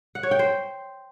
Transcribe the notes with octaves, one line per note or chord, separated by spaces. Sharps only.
F#5
C#5
G5
C5